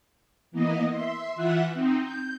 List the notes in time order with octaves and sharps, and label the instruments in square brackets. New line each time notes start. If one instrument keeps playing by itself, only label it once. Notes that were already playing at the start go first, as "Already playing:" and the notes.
[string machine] E3 A#3 B3 D#5
E5 C6
E3 F4 E5 F#5 F#6
C4 D#4
G6